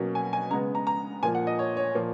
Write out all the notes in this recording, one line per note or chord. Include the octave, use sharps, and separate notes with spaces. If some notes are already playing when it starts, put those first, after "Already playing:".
Already playing: B2 F#3 A#3 C#4
G#5
G#5
C#3 G#3 B3 A#5
A#5
A#5
A#2 F3 A#3 G#5
F#5
D#5
C#5
C#5
A#2 F3 A#3